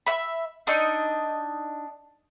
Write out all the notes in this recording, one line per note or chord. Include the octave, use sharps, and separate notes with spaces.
E5 B5
D4 D#4 D#5 E6